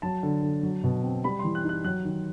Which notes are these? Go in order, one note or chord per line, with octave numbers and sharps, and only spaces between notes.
F#3 A5
D3
D3
F#3
B2
C4
G3 B5
E3 C6
F#6
D#4
F#6
F#3 F#6
D#3